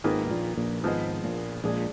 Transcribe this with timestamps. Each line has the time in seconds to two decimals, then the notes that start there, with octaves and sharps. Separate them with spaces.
0.04 G#1 G#2 D#3 A#3 F4 G#4 B4
0.26 B2
0.31 A#1 A#2
0.57 A#1 A#2
0.83 G#1 G#2 F3 B3 F4 G#4 D#5
1.24 A#1 A#2
1.64 A#1 A#2 G#3 D4 G#4